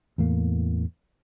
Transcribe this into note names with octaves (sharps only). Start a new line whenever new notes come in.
E2 A2 A#3